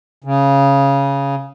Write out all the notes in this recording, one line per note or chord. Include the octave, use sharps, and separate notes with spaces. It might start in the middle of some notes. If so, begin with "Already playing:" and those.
C#3